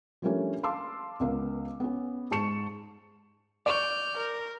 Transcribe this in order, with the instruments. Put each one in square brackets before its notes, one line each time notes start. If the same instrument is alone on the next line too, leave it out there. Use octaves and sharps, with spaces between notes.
[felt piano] F3 G3 A3 A#3 C#4 D4
F5 A5 C6 D6 E6
C#2 C#3 B3 A#4 F5
B3 C#4
G#2 G#4 A5 C#6 C#7 E7
[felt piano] D5 C#6 [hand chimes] D6 [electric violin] F6 G6
[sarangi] A#4